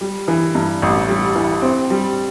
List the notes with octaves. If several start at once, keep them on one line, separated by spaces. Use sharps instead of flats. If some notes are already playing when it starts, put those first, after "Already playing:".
G3
E3
G2
A1
G3
E3
C4
G3